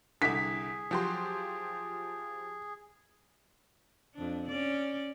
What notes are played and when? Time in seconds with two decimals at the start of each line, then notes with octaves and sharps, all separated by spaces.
0.22 C2 D3 G#4 B6
0.91 F3 F#3 G4 C6
4.14 F2 D4
4.48 C#4 D5